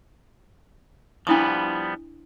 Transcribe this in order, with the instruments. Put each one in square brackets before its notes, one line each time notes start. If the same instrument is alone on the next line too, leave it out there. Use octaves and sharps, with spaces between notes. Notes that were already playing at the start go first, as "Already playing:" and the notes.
[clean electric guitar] F3 G3 B3 [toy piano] D4 E4 D#6